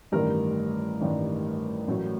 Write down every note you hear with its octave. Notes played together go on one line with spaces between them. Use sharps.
A1 G2 D#3 G3 A#4
A1 G2 D#3 G3
A1 A2 F#3